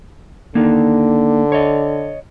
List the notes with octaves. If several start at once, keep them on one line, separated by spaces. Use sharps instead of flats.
D3 A#3 D#4
C#5 D#5